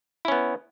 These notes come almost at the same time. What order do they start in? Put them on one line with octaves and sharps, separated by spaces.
E4 C#4 B3